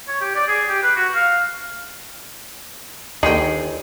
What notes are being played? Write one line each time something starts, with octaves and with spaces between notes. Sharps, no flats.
C#5
G4
D5
G#4
G4
B4
F#4
F5
G1 D#2 D3 D#3 G#4 G5